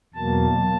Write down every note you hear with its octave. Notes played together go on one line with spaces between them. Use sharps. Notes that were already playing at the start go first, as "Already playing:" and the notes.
E2 B2 F#3 A#3 A5